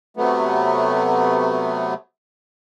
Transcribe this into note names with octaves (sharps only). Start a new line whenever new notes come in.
C3 F#3 A3 B3